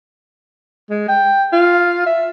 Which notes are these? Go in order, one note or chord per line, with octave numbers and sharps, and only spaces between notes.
G#3
G5
F4
E5